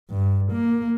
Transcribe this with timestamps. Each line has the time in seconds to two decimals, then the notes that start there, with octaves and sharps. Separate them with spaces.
0.10 G2
0.52 A#3